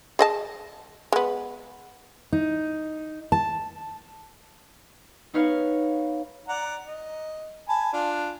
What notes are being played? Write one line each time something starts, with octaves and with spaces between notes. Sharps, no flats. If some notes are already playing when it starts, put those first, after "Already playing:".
G#4 D#5 A5
G#3 B3
D#4
A5
B3 D#4 B4 C#5 F5
D5 F#5 A#5
D#5
G#5 A5 B5
D4 F4